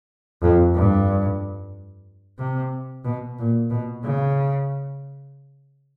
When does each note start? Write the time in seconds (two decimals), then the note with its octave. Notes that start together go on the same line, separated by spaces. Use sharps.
0.43 F2
0.75 G2
2.39 C3
3.05 B2
3.39 A#2
3.70 B2
4.04 C#3